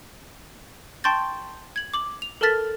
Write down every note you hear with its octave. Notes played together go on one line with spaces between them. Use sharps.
G5 A5 C6 C#6 G6 A6
G#6 F#7
D6 F#7
F7
A4 A#4 A5 F6 A6 B6